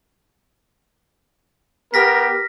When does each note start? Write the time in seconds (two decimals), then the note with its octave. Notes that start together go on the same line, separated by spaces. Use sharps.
1.94 B3 G4 A#4 F6 A#6 B6